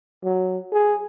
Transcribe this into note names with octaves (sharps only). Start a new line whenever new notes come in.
F#3
G#4